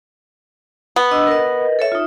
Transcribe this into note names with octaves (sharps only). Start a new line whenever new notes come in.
B3
D4 D#5 E6
A#4 B4 D#5
A4 C#5 E5
D#4 F4